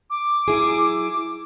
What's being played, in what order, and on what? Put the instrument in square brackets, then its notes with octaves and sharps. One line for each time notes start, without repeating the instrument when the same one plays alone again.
[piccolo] D6
[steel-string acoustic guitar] F#3 E4 G#4